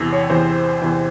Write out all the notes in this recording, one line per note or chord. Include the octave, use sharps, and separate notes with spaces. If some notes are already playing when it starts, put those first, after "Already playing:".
Already playing: E2 C3 E3
C#5
E2 C3 E3 C5
E2 C3 E3